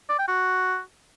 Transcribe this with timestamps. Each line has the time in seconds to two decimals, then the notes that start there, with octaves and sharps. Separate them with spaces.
0.09 D5
0.19 G5
0.28 F#4